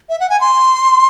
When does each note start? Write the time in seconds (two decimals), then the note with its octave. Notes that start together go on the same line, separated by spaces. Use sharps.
0.09 E5
0.20 F#5
0.30 G#5
0.41 C6